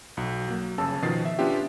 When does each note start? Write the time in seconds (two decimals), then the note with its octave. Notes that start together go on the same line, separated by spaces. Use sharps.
0.17 B1 F#4
0.48 F#3 A#3
0.78 G1 C#3 A5 E6
1.02 B2 D#3 F3 A6 C7
1.25 E5
1.38 B3 C#4 D4 F4 G4 E5